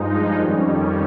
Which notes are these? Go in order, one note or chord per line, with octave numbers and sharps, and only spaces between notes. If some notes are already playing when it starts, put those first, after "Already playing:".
Already playing: G2 F3 G#3 D#4
F2 D#3 G3 C#4